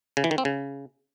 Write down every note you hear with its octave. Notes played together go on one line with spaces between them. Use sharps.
C#3
E3
D#3
C4
C#3